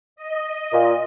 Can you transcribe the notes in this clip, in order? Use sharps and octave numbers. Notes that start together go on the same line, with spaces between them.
D#5
A#2